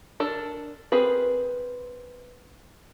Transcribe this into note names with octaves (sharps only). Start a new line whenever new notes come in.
D4 A4 A#4
C4 G#4 A#4 B4